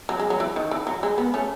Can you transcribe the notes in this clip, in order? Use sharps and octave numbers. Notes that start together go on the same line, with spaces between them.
F#3
G#3
F#3
E3
D#3
E3
F#3
G#3
B3
A3 C#4